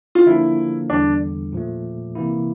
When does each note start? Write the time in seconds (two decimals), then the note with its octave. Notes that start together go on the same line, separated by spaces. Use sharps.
0.15 F4
0.26 D3 F3 A#3 D4 E4
0.90 E2 D3 G3 D4
1.52 A#2 F3 A3
2.15 C3 E3 A#3 E4